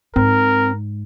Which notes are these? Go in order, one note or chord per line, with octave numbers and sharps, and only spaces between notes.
G#2 C4 A#4